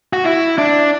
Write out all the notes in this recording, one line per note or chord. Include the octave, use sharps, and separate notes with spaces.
F#4
E4
D4